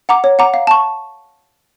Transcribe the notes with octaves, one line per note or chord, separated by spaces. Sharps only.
F#5 A#5 D6
C#5
F#5 A#5 D6
F5
A5 C#6